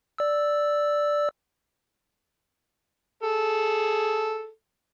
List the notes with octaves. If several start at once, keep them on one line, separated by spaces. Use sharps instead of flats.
D5 E6
G#4 A4